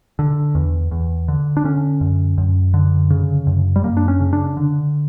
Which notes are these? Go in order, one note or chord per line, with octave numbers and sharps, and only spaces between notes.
D3
E2
E2
D3
D4
D3 C#4
F#2
F#2
D3
C#3
F#2
G3
F#2 A#3
D4
C#4
C#3
D4
D3